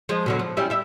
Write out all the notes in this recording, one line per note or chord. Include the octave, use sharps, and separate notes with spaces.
F3 G#3
B2 D3 F#3
F3
G3 C#4 E4
G3 E5